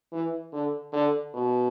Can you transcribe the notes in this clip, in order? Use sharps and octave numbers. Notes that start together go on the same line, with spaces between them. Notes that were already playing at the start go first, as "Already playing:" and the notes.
E3
D3
D3
B2